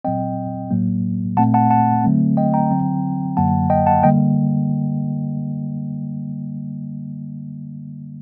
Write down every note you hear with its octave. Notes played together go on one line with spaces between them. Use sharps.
A#2 F#3 C4 D#5 G5
A2 F#3 A#3
A#2 A3 C4 F#5 A5
F#5 A5
F#5 A5
D3 F#3 A3 C4
D#5 G5
G5 A#5
D3 F#3 C4
F#2 D3 F#3 A#3 F#5 A5
D#5 G5
F#5 A5
D3 G3 A#3 D#5 G5